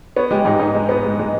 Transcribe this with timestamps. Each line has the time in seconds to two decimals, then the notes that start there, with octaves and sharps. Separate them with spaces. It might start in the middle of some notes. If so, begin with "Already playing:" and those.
0.16 B3 C#5
0.31 G#3 G4
0.45 G#2 D#4
0.59 G#2 D#4
0.75 G#3
0.89 B3
1.05 G#3
1.19 G#3